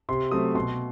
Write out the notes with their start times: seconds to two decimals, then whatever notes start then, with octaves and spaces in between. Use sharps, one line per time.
0.09 C3 C6
0.31 F#3 A3 C4 D#6
0.55 B2 C6